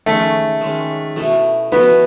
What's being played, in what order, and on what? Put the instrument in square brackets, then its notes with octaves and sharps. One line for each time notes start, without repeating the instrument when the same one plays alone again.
[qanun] D#3 G#3 C#4 [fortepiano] A3
[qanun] D#3 G#3 C#4
B2 A3 E4 A4
[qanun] B2 A3 E4 A4 [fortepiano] B3